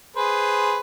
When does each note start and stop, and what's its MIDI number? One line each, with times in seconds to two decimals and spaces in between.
0.16 0.79 68
0.16 0.79 71
0.16 0.79 72